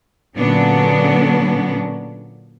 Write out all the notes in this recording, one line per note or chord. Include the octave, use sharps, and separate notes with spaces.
A#2 D3 F#3 B3 C#4 D4